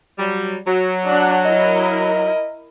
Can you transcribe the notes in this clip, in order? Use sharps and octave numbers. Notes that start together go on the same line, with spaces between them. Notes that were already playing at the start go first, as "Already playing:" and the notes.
F#3 G3
F#3
D4 F#5
E4 A#4 D#5